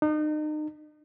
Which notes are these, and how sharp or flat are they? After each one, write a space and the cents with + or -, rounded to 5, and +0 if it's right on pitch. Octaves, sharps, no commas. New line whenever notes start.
D#4 -35